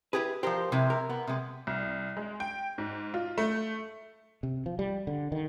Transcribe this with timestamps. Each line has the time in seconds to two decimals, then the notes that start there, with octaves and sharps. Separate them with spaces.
0.13 E4 G4 G#4 B4
0.43 F3 G4 A#4 C5
0.72 C3 G#3 E4
0.90 A#4
1.09 B3
1.27 C3 G#3
1.67 C2
2.17 G#3
2.40 G5
2.78 G#2
3.14 F4
3.38 A3
4.43 C3
4.66 F3
4.79 G3
5.07 D3
5.32 D#3